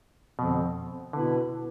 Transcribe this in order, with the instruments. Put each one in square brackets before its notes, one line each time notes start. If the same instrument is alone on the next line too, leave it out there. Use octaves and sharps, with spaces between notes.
[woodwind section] F2 D3 F3 C4 [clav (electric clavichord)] B2
[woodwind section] B2 B3 E4 B4 [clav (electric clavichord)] D3